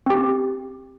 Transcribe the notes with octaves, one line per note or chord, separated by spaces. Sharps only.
C4 G4